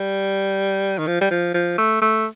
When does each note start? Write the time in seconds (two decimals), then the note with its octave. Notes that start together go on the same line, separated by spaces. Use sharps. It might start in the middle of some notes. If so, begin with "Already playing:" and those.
Already playing: G3
0.98 D#3
1.07 F3
1.21 G3
1.31 F3
1.54 F3
1.78 A3
2.02 A3